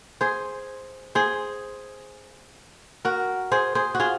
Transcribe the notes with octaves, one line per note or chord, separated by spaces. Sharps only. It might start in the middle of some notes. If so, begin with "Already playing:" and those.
G#4 C5
G#4 C5
F#4 A#4
G#4 C5
G#4 C5
F#4
F4 G#4